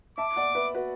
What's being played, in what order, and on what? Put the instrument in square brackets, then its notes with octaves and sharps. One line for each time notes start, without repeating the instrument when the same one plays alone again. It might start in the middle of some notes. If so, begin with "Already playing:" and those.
[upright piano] E5 A5 [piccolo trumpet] D6
[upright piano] D5 F#5
B4 E5
F#4 B4